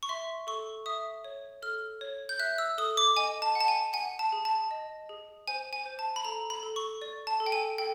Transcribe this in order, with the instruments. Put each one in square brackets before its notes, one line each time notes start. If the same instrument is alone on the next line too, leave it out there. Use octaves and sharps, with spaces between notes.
[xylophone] C#6
E5 C6
A4 C#6
E5 D#6
C#5
A4 F6
C#5
G6
E5 F#6
E6
A4 D#6
D6
D#5 G#5
A5
F#5
A5
G#5
F#5 G#5
A5
G#4
A5
D#5
G#4
C5 G#5
G#5
C5
A5
B5
A4 A#5
B5
A4
C#6
D5
A5
A4
G5
G#5
A4 G5